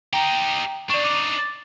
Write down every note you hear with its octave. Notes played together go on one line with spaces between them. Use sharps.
D#4 G4 G5 A#5
D4 D#4 D5 C#6
D6